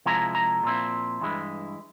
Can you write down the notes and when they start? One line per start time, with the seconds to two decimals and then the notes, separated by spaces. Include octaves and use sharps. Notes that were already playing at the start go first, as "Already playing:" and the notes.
0.05 C3 F3 G#3 E4 A#5
0.35 A#5
0.63 A#2 F3 C4 E4
1.21 G2 E3 G#3 E4